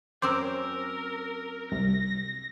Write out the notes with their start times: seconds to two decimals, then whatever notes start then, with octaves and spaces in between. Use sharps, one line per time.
0.22 F#2 C4 A#4 C5 C6 D6 E6
1.72 C2 A#6